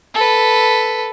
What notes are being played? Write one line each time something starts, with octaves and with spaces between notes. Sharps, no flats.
A4 B4